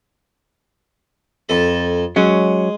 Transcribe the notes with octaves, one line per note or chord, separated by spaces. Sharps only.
F2 A4 B5
F#3 G#3 C#4